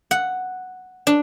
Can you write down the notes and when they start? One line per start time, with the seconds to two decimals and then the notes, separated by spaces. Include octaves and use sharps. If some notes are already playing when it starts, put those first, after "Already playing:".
0.11 F#5
1.07 D4